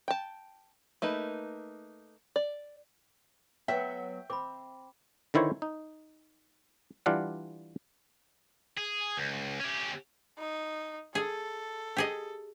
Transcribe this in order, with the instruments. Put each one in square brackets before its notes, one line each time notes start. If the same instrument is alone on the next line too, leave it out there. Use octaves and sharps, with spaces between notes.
[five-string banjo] G5 A5
A3 A#3 D#4 B4
D5
[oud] F#3 B3 [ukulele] E5 [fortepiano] G5
[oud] C4 [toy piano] B5 D6
[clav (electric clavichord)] D3 D#3 E4 C5 C#5
D#4
E3 G3 D4 F4 F5 F#5
[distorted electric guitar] G#4
C#2
C#4 G4
[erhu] D#4
[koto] G#4 [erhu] A4
[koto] G4 G#4 D#5